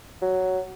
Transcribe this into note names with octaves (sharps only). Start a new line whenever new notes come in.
F#3